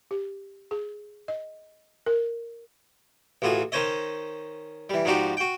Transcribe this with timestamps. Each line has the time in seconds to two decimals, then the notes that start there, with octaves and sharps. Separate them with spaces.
0.11 G4
0.71 G#4
1.28 D#5
2.06 A#4
3.42 A1 A2 F4 F#4 G#4
3.72 D#3 C#4 C5 C#5 D#5
4.90 E3 G3
5.05 G#2 F3 D4 D#4 F#4 G4
5.37 F#4 G5